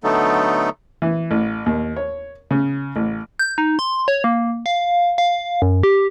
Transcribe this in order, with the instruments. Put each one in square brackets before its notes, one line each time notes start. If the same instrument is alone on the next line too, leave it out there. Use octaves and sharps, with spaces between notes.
[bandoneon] D3 F#3 A3 B3 D#4 A4
[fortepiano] E3
A1
D#2
C#5
C#3
A1
[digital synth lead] G6
D#4
C6
C#5
A#3
F5
F5
F#2
G4